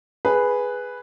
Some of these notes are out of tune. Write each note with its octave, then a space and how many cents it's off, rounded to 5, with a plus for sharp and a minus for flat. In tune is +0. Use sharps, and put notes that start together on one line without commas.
G#4 +0 B4 +0